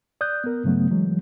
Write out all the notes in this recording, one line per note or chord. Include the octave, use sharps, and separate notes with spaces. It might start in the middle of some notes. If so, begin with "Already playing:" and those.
D5 D#6 F#6 G6
B3 A#4
G2 C#3 F#3 A3 B3
E3 F#3 G#3